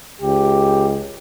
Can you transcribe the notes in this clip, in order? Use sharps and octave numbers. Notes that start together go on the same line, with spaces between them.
C#2 G4